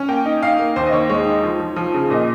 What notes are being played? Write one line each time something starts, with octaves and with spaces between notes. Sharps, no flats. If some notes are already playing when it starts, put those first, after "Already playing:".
Already playing: C#4
A#3 G5
D#4
D#4 F5
A#3
D#2 C5
D#5
D#2 C#5
G#3 C#5
D#4
F3
F3
F3
C#3
A#2 D#5